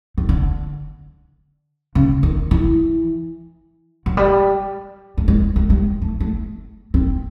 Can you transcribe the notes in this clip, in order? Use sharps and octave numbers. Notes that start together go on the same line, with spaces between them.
D#3
D3
C#3
D#3
E3
F#3
G3
A3
G#3
G#3
G3
A3
A3
C4